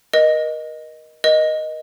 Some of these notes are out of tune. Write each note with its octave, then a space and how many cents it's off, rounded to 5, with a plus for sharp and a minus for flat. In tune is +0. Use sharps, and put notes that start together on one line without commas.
A#4 +35 D#5 -5
A#4 +40 D#5 +0